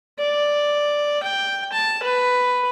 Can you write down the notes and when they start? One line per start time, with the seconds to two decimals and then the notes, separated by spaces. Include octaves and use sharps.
0.19 D5
1.23 G5
1.72 A5
2.03 B4